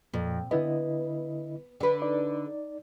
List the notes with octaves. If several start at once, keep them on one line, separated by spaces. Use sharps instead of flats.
F2 A#2
D3 B3 E4 D#5
D3 B4
D#4 D5